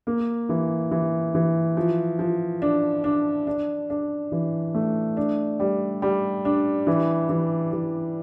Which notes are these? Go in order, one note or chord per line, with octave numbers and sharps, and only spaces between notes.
A#3
E3
E3
E3
F3
F3
D4
D4
D4
D4
E3
A3
D4
G3
G3
D4
E3
E3
E3